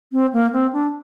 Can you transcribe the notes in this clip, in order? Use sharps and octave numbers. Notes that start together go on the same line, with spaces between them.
C4
A#3
C4
D4